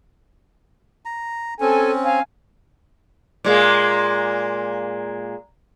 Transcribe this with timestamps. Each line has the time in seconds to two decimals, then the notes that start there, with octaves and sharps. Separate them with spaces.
1.05 A#5
1.60 C4 C#4 A4 G#5
2.05 F5 G#5
3.44 A#2 G#3 A#3